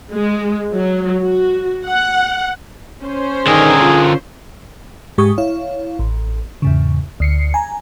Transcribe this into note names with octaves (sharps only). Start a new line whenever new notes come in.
G#3
F#3
F#4
F#5
C#4 C5
D3 D#3 G#4 A#4
F4
G#2 G#3 G4 C#6 D#6
E4 C#5 F5
A1
E2 G#2 C#3
D2 C7 C#7
G#5 A#5